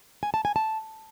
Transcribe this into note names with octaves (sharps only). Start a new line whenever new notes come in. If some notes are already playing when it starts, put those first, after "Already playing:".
G#5
A5
G#5
A5